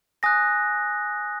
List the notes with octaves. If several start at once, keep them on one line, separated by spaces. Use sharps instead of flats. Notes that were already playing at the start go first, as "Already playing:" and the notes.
G#5 D#6 F#6 A#6